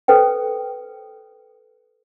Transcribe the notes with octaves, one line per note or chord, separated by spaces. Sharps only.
A4 B4 C5 G5